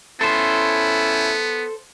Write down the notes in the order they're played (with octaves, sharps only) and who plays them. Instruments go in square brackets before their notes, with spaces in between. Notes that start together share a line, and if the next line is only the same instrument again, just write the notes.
[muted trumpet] B3 [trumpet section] C#4 E4 [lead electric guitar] A4 C5